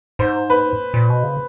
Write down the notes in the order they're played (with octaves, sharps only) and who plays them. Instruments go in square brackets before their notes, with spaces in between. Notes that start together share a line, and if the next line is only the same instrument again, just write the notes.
[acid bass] G#2 [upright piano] C5
[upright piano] B4
[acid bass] A#2
B2
C#3